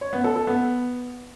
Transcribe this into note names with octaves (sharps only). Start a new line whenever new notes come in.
C#5
B3
A4
A4
B3